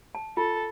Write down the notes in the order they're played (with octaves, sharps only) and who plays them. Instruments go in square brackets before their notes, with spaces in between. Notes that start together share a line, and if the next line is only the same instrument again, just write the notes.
[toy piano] A5
[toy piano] F4 [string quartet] A4